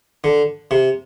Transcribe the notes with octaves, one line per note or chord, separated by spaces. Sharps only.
D3
C3